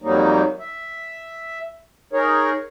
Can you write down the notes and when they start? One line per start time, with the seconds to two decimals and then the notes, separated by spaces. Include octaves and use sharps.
0.02 F2 D#3 F#3 G3 A#3 D#4
0.60 E5
2.13 D#4 G#4 A#4 C#5